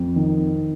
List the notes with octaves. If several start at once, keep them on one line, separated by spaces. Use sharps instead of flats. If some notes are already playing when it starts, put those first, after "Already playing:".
Already playing: F2
D#3